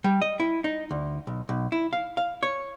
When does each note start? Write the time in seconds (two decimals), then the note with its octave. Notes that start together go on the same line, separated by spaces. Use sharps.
0.04 G3
0.22 D#5
0.40 E4
0.64 D#4
0.91 D2
1.27 B1
1.49 B1
1.72 E4
1.93 F5
2.17 F5
2.43 C#5